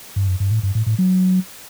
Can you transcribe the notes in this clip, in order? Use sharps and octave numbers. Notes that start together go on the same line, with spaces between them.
G2
F#2
G2
A2
G2
A2
A2
F#3